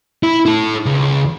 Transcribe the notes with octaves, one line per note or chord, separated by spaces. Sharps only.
E4
E4 A4
C#2